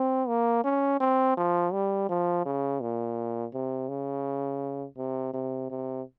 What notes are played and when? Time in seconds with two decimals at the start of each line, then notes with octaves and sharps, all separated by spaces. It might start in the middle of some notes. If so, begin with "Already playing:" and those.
Already playing: C4
0.28 A#3
0.64 C#4
1.01 C4
1.38 F3
1.73 G3
2.09 F3
2.45 C#3
2.81 A#2
3.54 C3
3.89 C#3
4.98 C3
5.34 C3
5.71 C3